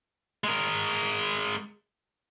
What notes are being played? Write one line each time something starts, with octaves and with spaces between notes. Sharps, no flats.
G#3 A#4